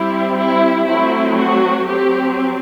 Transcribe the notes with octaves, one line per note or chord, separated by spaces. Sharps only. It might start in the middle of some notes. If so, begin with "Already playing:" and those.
Already playing: G3 C4 E4
E4
F#3 A3 C4 E4
F#4
F#3 C4 G4